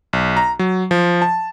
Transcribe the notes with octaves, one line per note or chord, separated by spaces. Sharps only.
B1
A#5
F#3
F3
A5